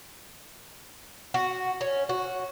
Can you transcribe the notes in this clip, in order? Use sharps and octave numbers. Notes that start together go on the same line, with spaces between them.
F#4
C#4
F#4